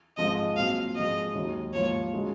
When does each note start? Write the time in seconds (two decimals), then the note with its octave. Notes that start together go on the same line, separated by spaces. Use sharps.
0.17 G#1 G#2 F3 G#3 C4 D#5
0.57 A#2 F#3 C4 F5
0.95 G#2 F3 G#3 D#5
1.34 D#2 D#3 F#3
1.73 G#2 F3 A#3 F4 C#5
2.13 C#3 G#3 D#4 F#4